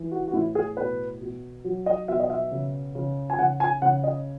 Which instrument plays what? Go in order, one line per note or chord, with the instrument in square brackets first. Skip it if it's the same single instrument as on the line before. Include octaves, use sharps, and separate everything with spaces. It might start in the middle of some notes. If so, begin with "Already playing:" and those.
Already playing: [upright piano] E3
F#4
F#4
A2 E4
G#4
B2 B4
B2
F#3
D#5
B2 E5
D#5
E5
C#3
C#3
G#5
C#3 F#5
G#5
C#3 F#5
D#5